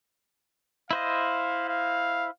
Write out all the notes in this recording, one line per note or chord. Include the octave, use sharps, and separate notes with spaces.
E4 C5 D#5 F5
F5